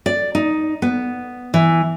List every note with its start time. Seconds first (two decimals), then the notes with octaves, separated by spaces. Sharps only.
0.06 D5
0.35 D#4
0.82 B3
1.54 E3